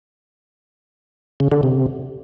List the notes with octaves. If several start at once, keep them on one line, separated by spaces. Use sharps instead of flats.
C#3
D3
C3